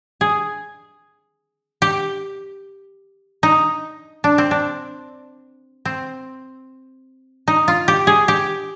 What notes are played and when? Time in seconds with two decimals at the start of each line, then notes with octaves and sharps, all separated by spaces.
0.21 G#4
1.82 G4
3.43 D#4
4.24 D4
4.38 C4
4.51 D4
5.85 C4
7.48 D#4
7.68 F4
7.88 G4
8.07 G#4
8.28 G4